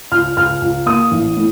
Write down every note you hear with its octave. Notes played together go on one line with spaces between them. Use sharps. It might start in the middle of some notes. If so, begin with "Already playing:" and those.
C#2 F6
C#2 F6
C#2
A#3 D#6
A1
A2